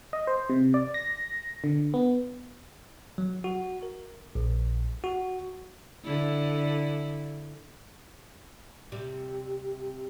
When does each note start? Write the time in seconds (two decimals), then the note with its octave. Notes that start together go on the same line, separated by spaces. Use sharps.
0.13 D#5
0.27 C5
0.50 C3
0.74 D5
0.94 A#6
1.64 D3
1.94 B3
3.18 F#3
3.44 F#4
3.83 A#4
4.35 A#1
5.04 F#4
6.04 D3 E4
8.92 C3 G3